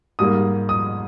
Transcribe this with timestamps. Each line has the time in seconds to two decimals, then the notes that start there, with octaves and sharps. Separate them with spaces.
0.19 G#2 G3 A#3 D#6
0.69 D#6